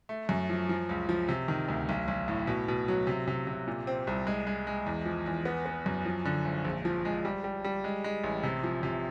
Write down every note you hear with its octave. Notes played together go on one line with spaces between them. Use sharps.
A3
F#2
F3
F3
C#2
F3
C3
D#3
D2
B1
B1
A2
B2
B2
F#3
C3
C3
C3
A#2
C4
C2
G#3
G#3
G#3
E2
F3
E2
B3
B3
F#2
F3
D3
G#1
A#1
F3
G#3
G3
G3
G3
G#3
G#3
A1
C3
F3
C3